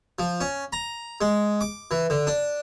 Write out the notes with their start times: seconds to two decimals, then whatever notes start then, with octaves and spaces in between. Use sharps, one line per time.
0.19 F3
0.41 C#4
0.73 A#5
1.21 G#3
1.61 D6
1.91 E3
2.10 D3
2.27 D4